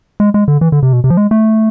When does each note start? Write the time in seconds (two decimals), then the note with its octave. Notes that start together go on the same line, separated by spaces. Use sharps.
0.20 G#3
0.34 G#3
0.48 D3
0.61 E3
0.72 D3
0.83 C3
0.93 B2
1.04 C3
1.10 F3
1.17 G#3
1.31 A3